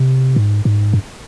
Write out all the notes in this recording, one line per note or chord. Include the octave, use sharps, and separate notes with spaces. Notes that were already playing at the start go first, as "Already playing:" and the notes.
Already playing: C3
G#2
G#2
G2